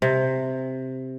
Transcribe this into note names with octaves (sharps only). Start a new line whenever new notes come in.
C3